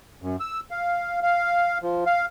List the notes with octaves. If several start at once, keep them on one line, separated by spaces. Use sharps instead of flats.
F#2
E6
F5
F5
F3
F5